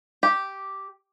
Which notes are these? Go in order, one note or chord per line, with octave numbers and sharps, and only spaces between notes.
G4